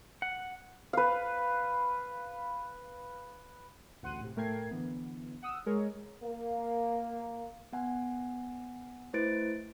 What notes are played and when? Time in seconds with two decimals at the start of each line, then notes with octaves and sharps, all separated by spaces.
0.22 F#5
0.93 B4 F5
4.02 A1 D2 F#5 C6 F#6 D#7
4.21 A2 C3
4.36 A2 A3 A#4 G5 G#6 C7
4.71 D3 E3 B3
5.42 F#5 D#6 E6
5.66 G#3 G#4 A#4 C#5
6.23 A#3
7.72 B3 F#5 G#5
9.13 A3 E4 B4 C5 A6 D7